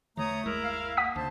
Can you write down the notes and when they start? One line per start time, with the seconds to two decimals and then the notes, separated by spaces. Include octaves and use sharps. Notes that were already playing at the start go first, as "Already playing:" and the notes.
0.17 E2 D3 E3 A3 C#5 A#5 D#6
0.46 G1 D#2 G#3 E4 A#4
0.63 F5
0.97 A#3 F#5 D#6 B6
1.16 D2 C#3 C5 A5